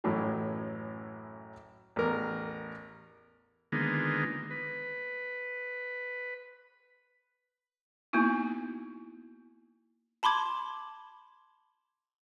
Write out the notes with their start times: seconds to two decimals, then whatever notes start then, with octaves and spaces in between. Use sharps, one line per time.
0.04 A1 F#2 A2 E3 F#3
1.96 A1 E2 A#4
3.72 D3 D#3 G#3 A#3 B3 F4
4.51 B4
8.13 A#3 B3 D#4 E4 F#4
10.23 A5 B5 C6 D6 G#6